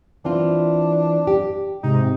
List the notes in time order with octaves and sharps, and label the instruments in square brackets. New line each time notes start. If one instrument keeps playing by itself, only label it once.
[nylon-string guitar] E3 C4 F4 [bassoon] D4
[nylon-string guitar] G4
[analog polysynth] G#2 C3 [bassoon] D#4